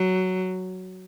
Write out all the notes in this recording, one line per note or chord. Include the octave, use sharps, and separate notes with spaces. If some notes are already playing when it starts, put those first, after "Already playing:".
Already playing: F#3